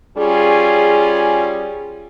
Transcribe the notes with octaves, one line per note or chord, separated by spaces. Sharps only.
G3 C#4 F4 G#4